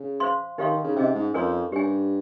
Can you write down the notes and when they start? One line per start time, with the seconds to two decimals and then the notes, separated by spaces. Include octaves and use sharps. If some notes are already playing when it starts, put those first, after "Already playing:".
Already playing: C#3
0.20 C5 F5 C6
0.58 D#3 D#4 G4 C#5 F5 C6
0.71 D#3
0.84 C#3
0.96 C3 C#4 G#4 D#5
1.14 G#2
1.34 F2 A#4 C#5 G#5 C6
1.72 G2 G4 C#5 G#5